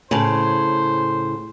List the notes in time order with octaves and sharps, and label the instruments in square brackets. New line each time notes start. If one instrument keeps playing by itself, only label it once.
[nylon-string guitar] A2 C#3 [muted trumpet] C5